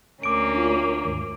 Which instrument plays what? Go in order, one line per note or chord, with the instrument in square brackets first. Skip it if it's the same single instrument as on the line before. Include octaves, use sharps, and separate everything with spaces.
[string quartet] D2 A#3 C#4 [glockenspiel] D6 D7
[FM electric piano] D4 F4
D#2 G#2